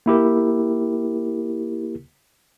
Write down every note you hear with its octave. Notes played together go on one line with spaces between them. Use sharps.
A#3 E4 G4 A#4